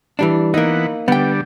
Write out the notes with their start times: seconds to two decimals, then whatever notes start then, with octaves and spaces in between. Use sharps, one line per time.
0.19 E3 G3 D4
0.54 E3 A#3 B3 D#4 F#5
1.08 D3 G3 B3 G5